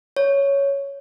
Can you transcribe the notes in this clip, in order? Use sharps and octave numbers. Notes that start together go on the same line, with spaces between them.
C#5